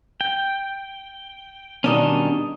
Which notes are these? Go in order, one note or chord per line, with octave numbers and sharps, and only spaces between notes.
G5
B2 D#3 G3 C#4 D4 D#5